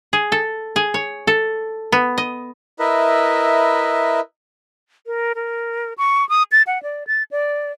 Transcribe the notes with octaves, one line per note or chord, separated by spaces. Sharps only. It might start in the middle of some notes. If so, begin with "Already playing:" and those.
G#4
A4
G#4
C#5
A4
B3
D#5
E4 A#4 B4 D#5 E5
A#4
A#4
C#6
D#6
A6
F#5
D5
A6
D5